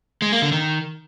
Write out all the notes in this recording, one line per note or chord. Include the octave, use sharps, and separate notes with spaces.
G#3
A#3
D3
D#3